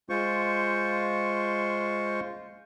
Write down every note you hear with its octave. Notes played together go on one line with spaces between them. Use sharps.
G#3 F4 C5 C#6